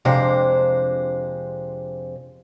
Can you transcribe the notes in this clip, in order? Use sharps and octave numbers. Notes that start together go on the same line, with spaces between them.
F2 C3 G#3 D4 C5